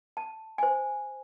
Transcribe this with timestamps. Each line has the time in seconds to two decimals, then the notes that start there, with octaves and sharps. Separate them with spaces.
0.17 A5
0.58 C5 G#5